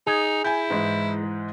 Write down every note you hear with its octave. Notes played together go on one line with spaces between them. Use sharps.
D#4 G#4
E4 G#5 G6
G#2 E3 G#3